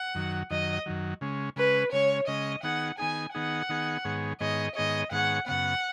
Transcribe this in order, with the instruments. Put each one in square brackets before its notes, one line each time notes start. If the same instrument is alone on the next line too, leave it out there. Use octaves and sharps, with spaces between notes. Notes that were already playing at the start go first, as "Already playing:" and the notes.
Already playing: [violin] F#5
[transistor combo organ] F#2 D#3 F#3
[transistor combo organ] F#2 D#3 F#3 [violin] D#5
[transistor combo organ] F#2 D#3 F#3
C#3 G#3 C#4
[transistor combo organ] C#3 G#3 C#4 [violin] B4
[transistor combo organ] C#3 G#3 C#4 [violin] C#5
[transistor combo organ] C#3 G#3 C#4 [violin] D#5
[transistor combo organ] D#3 B3 D#4 G#4 [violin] F#5
[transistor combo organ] D#3 B3 D#4 G#4 [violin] G#5
[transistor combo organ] D#3 B3 D#4 G#4 [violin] F#5
[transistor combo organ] D#3 B3 D#4 G#4
G#2 D#3 B3 G#4 C#5
[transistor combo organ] G#2 D#3 B3 G#4 C#5 [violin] D#5
[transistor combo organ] G#2 D#3 B3 G#4 C#5 [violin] D#5
[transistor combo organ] G#2 D#3 B3 G#4 C#5 [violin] F#5
[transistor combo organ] F#2 C#3 B3 [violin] F#5